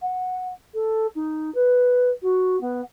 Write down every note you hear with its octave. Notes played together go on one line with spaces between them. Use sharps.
F#5
A4
D#4
B4
F#4
B3